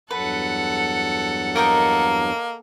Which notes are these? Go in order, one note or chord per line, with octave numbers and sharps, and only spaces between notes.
E2 G2 F#3 A4 B4 F#5
A#3 A#4 D#5 G5